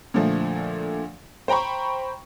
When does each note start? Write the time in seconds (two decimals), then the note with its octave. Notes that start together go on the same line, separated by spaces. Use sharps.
0.14 A#2 D3 F3 A3
1.48 C5 G5 A#5 B5 C#6